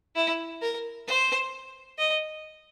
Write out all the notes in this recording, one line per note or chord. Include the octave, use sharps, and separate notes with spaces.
E4
A#4
C5
D#5